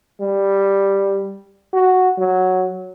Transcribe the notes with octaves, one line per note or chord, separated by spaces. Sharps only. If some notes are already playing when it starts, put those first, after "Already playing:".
G3
F#4
F#3